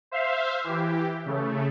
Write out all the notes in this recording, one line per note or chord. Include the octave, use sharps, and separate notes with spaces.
C5 E5 F5
E3 G4
C#3 A3